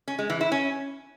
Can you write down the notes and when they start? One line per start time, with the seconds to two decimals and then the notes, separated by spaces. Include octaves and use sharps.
0.08 C#4
0.19 G#3
0.30 E3
0.41 E4
0.52 C#4